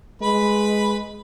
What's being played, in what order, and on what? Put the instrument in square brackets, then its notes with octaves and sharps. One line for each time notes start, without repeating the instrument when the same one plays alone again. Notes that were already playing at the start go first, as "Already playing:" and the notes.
[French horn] G#3 [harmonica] B4 B5